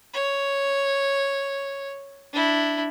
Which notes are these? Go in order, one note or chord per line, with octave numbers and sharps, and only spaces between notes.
C#5
D4 E4